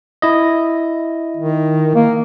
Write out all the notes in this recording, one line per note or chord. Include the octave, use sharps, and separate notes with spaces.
E4 D#5
D#3
A#3